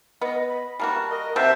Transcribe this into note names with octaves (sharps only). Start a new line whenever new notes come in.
B3 D#5
B5
G3 A#3 F#4 A5
A#4 D#5
C3 C5 E5 F#5 A5